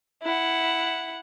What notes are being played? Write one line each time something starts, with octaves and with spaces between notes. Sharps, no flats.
E4 F#5